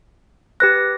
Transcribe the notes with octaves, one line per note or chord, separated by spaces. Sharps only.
G4 B4 F#6 A#6